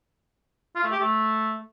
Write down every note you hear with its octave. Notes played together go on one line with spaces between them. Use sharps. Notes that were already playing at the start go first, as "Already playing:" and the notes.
F4
A3
G4
A3